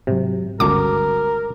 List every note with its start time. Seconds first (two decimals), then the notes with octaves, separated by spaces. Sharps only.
0.07 G#2 C3 F#3
0.60 G1 C#2 F#4 A4 A#4 D6